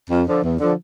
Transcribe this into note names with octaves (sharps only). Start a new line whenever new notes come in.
F2
D3 F3
E2
D3 F3